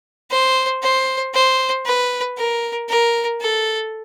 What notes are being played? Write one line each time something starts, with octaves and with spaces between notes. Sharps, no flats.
C5
C5
C5
B4
A#4
A#4
A4